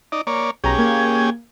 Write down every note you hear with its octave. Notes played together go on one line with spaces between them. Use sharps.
D#4 D5
A#3 C#5 D5
B1 C#4 G4 G#4 A#5
A#3 G#6